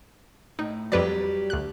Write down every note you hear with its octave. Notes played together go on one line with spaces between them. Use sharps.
A2 D#4
F2 F#3 G3 G4 B4 D5
D2 F#6